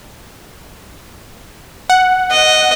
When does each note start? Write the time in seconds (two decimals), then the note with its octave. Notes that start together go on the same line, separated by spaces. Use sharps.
1.90 F#5
2.31 D#5